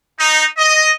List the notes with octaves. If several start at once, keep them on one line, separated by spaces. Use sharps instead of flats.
D#4
D#5